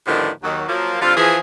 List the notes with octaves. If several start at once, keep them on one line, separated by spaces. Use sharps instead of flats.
A2 D3 D#3 F3 G3 B3
D#2 D#3 F#3
F3 F#3 A#3
D3 G3 C4 F4
E3 F3 G#4